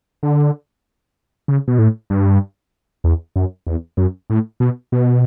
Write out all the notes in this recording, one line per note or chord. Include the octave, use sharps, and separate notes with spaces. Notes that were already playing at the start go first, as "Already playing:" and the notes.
D3
C#3
B2
A2
G2
E2
F#2
E2
F#2
A2
B2
B2